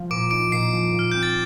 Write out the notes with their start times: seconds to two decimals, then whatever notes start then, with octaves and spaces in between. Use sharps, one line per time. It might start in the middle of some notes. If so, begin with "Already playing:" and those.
Already playing: F3
0.10 A#2 D6 D7
0.30 D#4 D6 D7
0.52 A#2 C7
0.73 F3
0.94 A#2
0.99 F6
1.12 C4 G6
1.23 A6